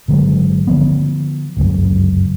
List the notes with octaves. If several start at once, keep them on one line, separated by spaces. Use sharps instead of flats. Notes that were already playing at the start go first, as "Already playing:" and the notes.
G1 D3 F#3 G#3
D3 F3 B3
G1 C#2 F#2